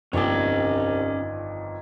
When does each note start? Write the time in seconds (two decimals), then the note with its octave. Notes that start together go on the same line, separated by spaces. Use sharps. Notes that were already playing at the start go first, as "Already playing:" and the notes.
0.13 G1 C2 F2 D#3 C#4 D5 G5 G#5